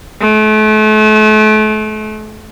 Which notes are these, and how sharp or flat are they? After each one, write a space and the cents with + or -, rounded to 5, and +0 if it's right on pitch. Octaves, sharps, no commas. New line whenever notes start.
A3 -35